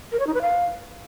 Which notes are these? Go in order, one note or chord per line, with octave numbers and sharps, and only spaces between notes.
A#4
C#5
D#4
B4
F5